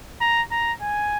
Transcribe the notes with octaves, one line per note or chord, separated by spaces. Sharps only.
A#5
A#5
G#5